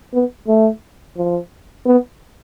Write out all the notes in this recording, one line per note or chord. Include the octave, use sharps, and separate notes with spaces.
B3
A3
F3
B3